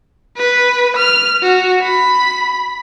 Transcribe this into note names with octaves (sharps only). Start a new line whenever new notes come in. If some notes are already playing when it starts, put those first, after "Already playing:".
B4
F6
F#4
B5